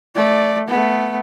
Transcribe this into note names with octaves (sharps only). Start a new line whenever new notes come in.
A3 D5
A3 B3